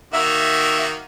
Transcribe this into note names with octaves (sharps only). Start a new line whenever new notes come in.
D#3 A#3 F#4 E5